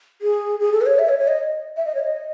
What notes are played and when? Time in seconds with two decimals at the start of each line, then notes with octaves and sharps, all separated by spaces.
0.22 G#4
0.60 G#4
0.73 A4
0.81 B4
0.86 C#5
0.99 E5
1.09 C#5
1.19 C#5
1.28 D#5
1.77 E5
1.86 D#5
1.95 C#5
2.03 D#5